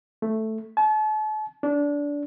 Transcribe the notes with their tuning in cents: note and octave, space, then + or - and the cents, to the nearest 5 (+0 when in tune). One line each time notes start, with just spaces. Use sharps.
A3 +0
A5 -40
D4 -20